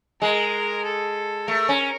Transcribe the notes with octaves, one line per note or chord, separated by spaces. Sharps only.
G#3 A#4
A4
A3 A#4
C#4